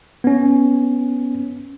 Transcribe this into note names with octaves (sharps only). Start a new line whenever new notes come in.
B3 C#4